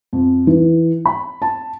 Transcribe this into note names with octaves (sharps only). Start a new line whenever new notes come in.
F2
E3
B5
A5